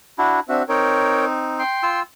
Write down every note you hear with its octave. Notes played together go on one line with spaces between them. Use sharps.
D4 E4 F#4
C4 D4 F#4 E5
C4 D#4 A#4 C#5 G5
G5 C6
F4 E6